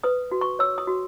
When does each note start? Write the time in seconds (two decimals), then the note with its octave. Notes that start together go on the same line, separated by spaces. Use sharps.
0.04 B4 D#6
0.31 F#4
0.41 C#6
0.59 C#5 E6
0.78 D#6
0.87 F#4